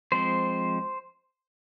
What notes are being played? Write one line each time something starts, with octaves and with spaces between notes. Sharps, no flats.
F3 G#3 C4 C5